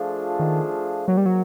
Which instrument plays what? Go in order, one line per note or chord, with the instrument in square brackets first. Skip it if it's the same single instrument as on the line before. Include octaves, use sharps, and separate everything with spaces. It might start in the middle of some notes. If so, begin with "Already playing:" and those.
Already playing: [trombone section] F3 A3 D4 F4 G#4
[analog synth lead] D#3
[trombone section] G#2 F3 A#3 [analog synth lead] F#3
[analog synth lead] G3
F#3